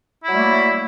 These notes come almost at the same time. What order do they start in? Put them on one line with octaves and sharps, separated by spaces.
E4 F#3 G3 A3 A#3